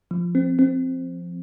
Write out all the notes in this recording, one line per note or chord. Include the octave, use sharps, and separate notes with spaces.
F3
C4
C4